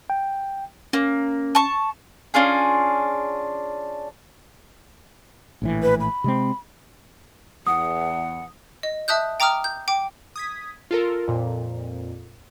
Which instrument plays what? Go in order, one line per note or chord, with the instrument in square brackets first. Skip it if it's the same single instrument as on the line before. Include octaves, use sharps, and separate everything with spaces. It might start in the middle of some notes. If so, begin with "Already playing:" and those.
[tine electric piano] G5
[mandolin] A#3 [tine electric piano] C#4
[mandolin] A5 C#6
C#4 D4 F4 G#4
[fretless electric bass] A#1 A2 E3
[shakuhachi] B4
B5
[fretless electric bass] C3 G#3 C4
[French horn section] E2 [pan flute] F#5 [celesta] D#6
[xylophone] D#5
E5 A5 D#6 F#6 G6
G5 A#5 D6 D#6 F6
G6
G5 D6
[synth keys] D#6 G#6 B6
F4 A4 A#4
F2 A#2